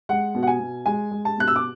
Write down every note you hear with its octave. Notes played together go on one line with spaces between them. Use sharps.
G#3 F#5
B2
F#5
G#5
B2
G#3 G#5
G#3
A5
B2 F#6
E6
D6